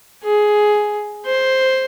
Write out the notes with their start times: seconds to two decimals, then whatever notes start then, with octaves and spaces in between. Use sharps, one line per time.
0.24 G#4
1.26 C5